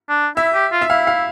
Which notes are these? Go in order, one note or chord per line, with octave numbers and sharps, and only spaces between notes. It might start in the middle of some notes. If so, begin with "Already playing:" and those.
D4
E4 E5
G4
F4
E5
E4 F5
F5